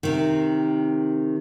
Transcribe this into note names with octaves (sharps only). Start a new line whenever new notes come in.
C3 D#3